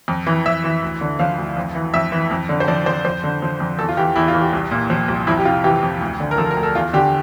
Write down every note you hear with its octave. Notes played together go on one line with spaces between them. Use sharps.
F2
E3
F2 E5
E3
D2
D3
F3 F5
D2
F2
E3
F2 E5
E3
F2
D3
C5
F3 D5
F2 C5
F2 C5
D3
F3
F2
E2 A4
F4
E3 G4
E2 E4
F4
E3
G4
C2
A#2
F3
C2
F2 E4
G4
C3 F4
E3 G4
F2
D2
D3
A#4
F3 A4
A#4
D2
A4
E2 F4
D3 G4